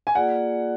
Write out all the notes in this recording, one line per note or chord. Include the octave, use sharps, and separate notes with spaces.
G#5
A#3 F4 G#4 D5 F#5